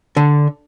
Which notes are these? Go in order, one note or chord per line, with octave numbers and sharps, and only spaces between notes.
D3